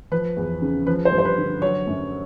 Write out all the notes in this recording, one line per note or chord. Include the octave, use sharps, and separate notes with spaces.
F3 B4
E2
C#3
F3 B4
C5
G2
C5
B4
D3
F#3 C#5
F#2